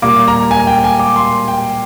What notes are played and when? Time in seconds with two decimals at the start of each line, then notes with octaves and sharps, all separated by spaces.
0.02 A#2 G3 A#3 D6
0.28 A#5
0.51 G#5
0.67 G5
0.84 G#5
0.99 D6
1.16 C6
1.48 G5